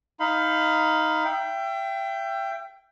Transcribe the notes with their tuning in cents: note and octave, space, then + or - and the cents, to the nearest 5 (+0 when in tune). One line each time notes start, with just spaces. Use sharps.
D#4 +15 F5 +0 B5 +30
E5 +35 G5 +0